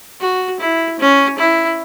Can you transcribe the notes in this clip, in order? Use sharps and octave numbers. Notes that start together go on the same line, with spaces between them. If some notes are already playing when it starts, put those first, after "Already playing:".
F#4
E4
C#4
E4